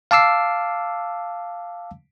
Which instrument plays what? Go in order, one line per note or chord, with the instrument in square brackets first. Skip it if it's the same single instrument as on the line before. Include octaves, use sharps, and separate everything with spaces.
[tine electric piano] F5 A5 D6 E6 C7